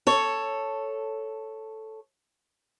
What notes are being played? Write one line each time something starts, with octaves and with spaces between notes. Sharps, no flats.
A4 C#5